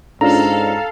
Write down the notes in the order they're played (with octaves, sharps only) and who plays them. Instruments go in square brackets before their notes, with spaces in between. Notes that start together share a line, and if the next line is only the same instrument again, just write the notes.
[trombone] G#2 [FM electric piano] C#4 D4 F4 [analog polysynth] A4 F5 [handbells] A#5